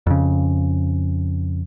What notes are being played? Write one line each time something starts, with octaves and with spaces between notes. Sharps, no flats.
F2 C#3